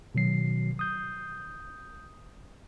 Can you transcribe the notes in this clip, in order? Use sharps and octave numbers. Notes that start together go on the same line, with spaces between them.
B2 D#3 F#3 C7
D#6 G6